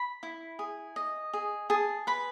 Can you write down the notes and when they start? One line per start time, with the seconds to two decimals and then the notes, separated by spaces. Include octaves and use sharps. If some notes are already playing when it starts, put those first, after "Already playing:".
Already playing: B5
0.23 E4
0.59 G#4
0.96 D#5
1.33 G#4
1.70 G#4 A5
2.07 B4 B5